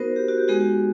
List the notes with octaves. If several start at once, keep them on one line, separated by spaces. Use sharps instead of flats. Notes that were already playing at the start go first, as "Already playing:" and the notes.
Already playing: B3 D#4 F#4 A#4 C5
G4
F#4
G4
G#3 B3 D#4 F#4 G#4